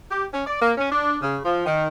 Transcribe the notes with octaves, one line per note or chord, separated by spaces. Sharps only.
G4
C#4
D5
A#3
C#4
D4
C#3
F3
D#3